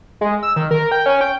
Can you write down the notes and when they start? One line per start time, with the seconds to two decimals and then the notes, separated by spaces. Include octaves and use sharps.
0.21 G#3
0.43 E6
0.56 D#3
0.71 A#4
0.91 G5
1.06 C#4
1.21 G5